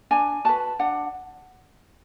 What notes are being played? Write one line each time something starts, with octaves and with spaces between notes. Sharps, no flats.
D4 G#5
F#4 B4 A5
D4 F#5